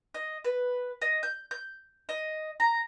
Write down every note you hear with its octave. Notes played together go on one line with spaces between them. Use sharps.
D#5
B4
D#5
G6
G6
D#5
A#5